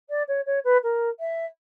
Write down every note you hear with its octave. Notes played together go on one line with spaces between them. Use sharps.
D5
C#5
C#5
B4
A#4
E5